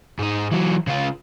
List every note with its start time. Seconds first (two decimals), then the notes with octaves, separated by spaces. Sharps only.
0.19 G#2 D#4
0.52 E3 F#3
0.87 C#3 F4